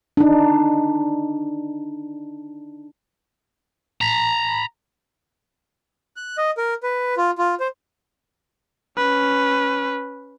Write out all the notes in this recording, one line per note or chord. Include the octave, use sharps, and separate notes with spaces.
D4 D#4
A#5 B5
F#6
D#5
A#4
B4
F4
F4
C5
C#4 B4